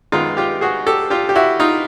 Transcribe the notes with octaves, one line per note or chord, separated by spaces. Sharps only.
F#2 D#3 G#3 B3 D#4 F4
F4 G4
F#4 G#4
G4 A4
F4 G4
G4
E4 F#4
D#4 F4